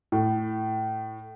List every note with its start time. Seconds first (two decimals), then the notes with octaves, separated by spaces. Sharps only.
0.12 A2